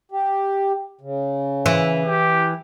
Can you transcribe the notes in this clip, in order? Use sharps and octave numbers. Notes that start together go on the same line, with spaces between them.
G4
C#3
E3
G4